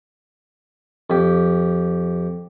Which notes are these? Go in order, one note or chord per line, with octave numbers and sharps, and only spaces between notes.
F2 G4